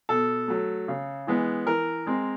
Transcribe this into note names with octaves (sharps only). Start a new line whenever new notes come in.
B2 A4
F#3 A3
C#3
E3 G#3 B3
E3 A#4
G#3 C4